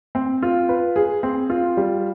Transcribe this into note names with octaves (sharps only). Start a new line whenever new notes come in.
C4
F4
B4
G#4
C4
F4
G3